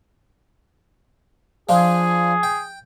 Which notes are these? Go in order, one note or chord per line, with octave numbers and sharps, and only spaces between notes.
F3 D4 F4 G#4
G5